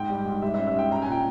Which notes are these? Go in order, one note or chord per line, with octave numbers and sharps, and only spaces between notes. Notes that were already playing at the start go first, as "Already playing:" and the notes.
Already playing: G#2 G5
G3
G#2
G3 E5
E5
C#4
E5
G#2 G5
C#4 A#5
G#5
A#2 G5